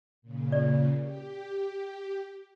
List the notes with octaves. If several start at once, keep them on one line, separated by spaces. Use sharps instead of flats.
A#2 C#3
D5
G4